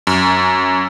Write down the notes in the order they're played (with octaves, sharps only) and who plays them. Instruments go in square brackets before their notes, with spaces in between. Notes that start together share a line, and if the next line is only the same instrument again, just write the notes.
[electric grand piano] F#2